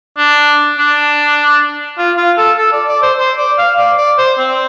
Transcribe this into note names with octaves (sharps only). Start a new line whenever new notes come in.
D4
D4
F4
F4
A4
A4
D5
D5
C5
C5
D5
F5
D5
D5
C5
C4